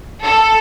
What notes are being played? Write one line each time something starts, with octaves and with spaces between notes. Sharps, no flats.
A4